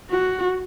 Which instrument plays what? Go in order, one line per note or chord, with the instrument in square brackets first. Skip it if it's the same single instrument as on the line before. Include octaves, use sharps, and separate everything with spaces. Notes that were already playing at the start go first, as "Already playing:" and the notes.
[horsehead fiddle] F#4